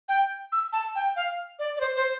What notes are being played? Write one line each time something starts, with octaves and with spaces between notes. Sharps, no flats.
G5
E6
A5
G5
F5
D5
D5
C5
C5